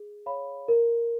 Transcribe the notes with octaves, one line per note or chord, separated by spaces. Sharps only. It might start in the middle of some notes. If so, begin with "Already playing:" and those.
Already playing: G#4
C#5 F5 B5
A#4